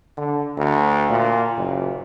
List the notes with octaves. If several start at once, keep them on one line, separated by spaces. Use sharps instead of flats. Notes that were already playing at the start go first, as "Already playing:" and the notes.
D3
D2
A#2
F#1